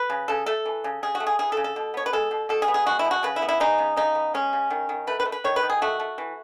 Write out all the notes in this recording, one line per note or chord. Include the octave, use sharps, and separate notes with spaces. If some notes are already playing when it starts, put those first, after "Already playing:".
Already playing: B4
C#3
C#3 A4
A3 A4
E3
C#3
C#3 G#4
F#4
A3
G#4
E3 G#4
A4
C#3
A4
B2
B3 C#5
B4
G#3 A4
B2
B2 A4
G#4
B3
G#4
G#3 F#4
E4
B2
F#4
C#3 B4
E4
B3
E4
G#3 D#4
C#3
C#3 D#4
B3
G#3 C#4
C#3
D#3
D#3
A3 B4
B4
A3
B4
D#3 C#5
B4
D#3
G#4
A3 F#4
A3
E3